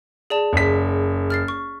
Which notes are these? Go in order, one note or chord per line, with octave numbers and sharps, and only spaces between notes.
G#4 D5 A5
F#1 B6
F6 A6 C7
C#6